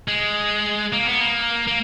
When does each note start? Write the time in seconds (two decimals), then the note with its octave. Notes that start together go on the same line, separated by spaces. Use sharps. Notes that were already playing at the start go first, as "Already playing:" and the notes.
0.08 G#3
0.93 A#3
1.07 B3
1.20 A#3
1.67 A#3